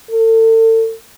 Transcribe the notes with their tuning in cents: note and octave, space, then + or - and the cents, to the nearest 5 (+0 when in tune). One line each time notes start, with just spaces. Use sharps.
A4 +35